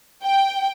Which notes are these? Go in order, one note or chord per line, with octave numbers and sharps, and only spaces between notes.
G5